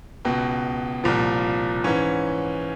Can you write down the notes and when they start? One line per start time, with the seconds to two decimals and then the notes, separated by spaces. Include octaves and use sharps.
0.25 C#2 B2
1.04 C2 A#2 F3
1.84 G#2 E3 C#4